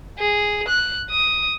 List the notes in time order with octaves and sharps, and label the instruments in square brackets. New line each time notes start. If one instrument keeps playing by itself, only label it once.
[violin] G#4
F#6
D#6